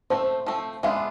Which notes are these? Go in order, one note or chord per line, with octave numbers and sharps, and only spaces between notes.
F3 A3 C4 C5
F3 A3 C4
G#3 B3 D4 F4 E5